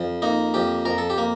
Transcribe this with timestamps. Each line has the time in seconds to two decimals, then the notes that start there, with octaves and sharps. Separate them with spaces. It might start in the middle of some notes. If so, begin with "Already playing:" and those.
Already playing: F2
0.22 A#3 D#4
0.54 F2 G4
0.85 F2 A#4
0.98 A4
1.10 G4
1.18 A#3